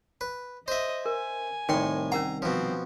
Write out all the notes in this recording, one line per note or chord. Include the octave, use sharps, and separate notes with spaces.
B4
C5 D#5 E5
A#4 G#5
C2 A2 D#3 G5 C6
C#4 A#4 F#5 A#5
B2 F3 C4